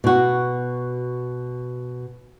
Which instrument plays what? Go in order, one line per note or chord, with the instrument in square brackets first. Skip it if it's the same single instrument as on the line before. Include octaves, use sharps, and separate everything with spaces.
[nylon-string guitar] B2 F#4